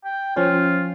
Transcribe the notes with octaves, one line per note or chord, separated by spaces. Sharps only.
G5
F3 C#4 F4 C5